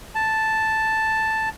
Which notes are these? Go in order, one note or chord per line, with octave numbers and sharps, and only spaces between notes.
A5